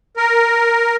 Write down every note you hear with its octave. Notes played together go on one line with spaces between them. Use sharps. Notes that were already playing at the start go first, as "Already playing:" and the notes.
A#4